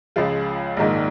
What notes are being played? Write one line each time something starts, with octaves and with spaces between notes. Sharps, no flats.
C#2 C#3 F3 G#3 F4
A#1 G#2 D#3 A#3 D#4